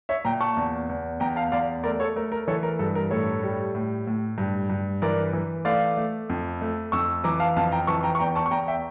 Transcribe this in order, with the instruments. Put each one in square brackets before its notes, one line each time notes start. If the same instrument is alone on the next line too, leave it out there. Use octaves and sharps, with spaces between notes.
[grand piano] C#5 E5
A#2 G5 A#5
A5 C#6
E2
E2
E2 G5 A#5
F5 A5
E2 D5 F5
A3 A#4 D5
A4 C#5
A3 A#4
A#4
E3 A4 C#5
A#4
G2 A4
A#4
A2 A4 C#5
G3
A2
A2
G2
G2
E3 A#4 D5
E3
A3 D5 F5
A3
F2
A3
F2 C#6 E6
E3 A#5 D6
F5 A5
F2 F5 A5
G5 A#5
E3 A5 C#6
G5 A#5
C#6
E2 G5 A#5
A5 C#6
C#6
E2 G5 A#5
E5 G5